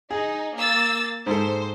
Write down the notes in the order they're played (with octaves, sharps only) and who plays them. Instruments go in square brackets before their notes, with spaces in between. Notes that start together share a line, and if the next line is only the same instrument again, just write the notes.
[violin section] D#4 [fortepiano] G#4
[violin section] A#3 E6 A6
[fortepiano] G#2 A4 [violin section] C5